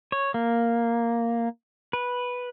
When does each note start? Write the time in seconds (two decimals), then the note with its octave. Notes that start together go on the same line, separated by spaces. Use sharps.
0.12 C#5
0.34 A#3
1.93 B4